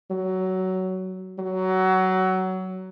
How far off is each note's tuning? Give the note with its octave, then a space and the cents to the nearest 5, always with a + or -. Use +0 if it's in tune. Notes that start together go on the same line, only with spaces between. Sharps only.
F#3 +15
F#3 +20